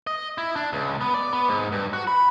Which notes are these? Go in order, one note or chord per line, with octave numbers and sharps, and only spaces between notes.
D#5
E4
D4
C#2
B3
D5
B3
G#2
G2
F#4
B5